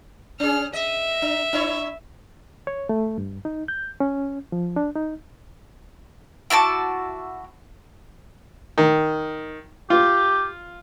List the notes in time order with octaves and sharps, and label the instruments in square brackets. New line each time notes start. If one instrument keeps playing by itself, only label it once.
[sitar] C#4 G#4 [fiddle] F6
[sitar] D#5 [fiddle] E5
[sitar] D4
D4 E4 C#5
[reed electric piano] C#5
A3
G2
D#4
G6
C#4
F3
D4
D#4
[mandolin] E4 F#4 A5 D6
[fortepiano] D#3
[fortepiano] F4 [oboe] G4